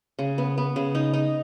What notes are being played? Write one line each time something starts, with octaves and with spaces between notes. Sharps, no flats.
C#3
B3
B3
C#3
D#4
D#4